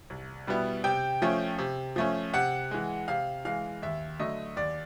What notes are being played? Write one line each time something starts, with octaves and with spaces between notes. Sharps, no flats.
C2
B2 G3 B3 E4
C3 G5
F3 A3 C#4
C3
F3 A3 C#4
C3 F#5
E3 G#3
C3 F5
E3 G#3 F5
D#2 E5
D3 F#3 A3 D#5
D#2 D5